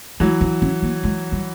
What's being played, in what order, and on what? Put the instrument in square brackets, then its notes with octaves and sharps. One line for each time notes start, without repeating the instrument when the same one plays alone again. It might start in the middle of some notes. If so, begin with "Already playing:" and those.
[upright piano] E3 F#3 [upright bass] G#3
[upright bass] D4
C#4
A#3
G#3
G3